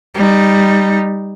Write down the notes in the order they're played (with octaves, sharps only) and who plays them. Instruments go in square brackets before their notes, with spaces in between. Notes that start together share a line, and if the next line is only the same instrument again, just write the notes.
[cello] G3 D#4